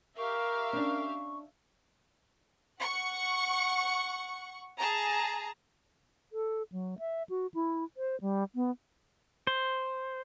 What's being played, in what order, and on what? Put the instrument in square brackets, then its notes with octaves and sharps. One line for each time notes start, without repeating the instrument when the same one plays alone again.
[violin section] G4 E5 F5 [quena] A#4 [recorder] C#6
[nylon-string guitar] C#4 D4
[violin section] F#5 C#6
G#4 A5 A#5
[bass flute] A4
F#3
E5
F#4
E4
C5
G3
B3
[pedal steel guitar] C5